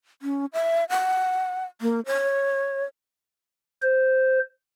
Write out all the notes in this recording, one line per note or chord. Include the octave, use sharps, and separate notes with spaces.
C#4
E5
F#5
A#3
C#5
C5